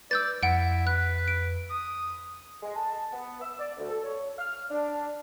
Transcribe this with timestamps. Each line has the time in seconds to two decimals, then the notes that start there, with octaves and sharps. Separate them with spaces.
0.11 B4 D5 E6 G6 A6
0.43 F2 E4 F#5 D7
0.87 B4 F#6
1.28 D7
1.70 D#6
2.63 G#3
2.75 A5
2.91 A5
3.13 B3
3.42 E6
3.59 D5
3.78 D2
3.90 A4
4.04 C#5
4.39 F6
4.70 D4